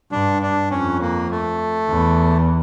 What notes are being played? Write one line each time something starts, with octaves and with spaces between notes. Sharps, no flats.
G2 D4
D4
F2 C#4
A#3
A3
E2